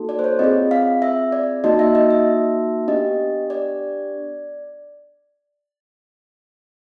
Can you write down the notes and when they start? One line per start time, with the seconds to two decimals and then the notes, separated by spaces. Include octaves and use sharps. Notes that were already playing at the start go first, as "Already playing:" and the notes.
Already playing: A#3 D#4 F#4 A4
0.09 D5
0.19 C5
0.24 C#5
0.39 C4 F4 G#4 D#5
0.71 F5
1.02 E5
1.32 D5
1.64 A#3 D#4 F#4 D#5
1.79 E5
1.95 D#5
2.11 E5
2.88 B3 D4 G4 D#5
3.50 D5